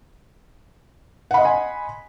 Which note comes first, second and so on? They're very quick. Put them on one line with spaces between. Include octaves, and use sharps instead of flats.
F#5 B5 D#5 C6 G#5